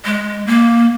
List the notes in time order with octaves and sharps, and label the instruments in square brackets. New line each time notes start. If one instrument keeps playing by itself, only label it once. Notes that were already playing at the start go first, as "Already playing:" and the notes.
[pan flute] G#3
A#3